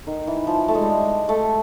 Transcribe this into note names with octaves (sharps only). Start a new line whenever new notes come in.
D#3
E3
F3
A3
G#3
G3
G#3
A3